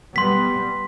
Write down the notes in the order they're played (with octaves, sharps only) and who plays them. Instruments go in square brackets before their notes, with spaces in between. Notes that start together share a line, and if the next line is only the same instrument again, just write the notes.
[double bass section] G3 B3 [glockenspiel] C6 B6